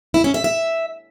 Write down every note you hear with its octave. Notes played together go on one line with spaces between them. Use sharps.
E4
C#4
E5
E5